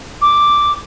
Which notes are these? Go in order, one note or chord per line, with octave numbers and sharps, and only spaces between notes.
D6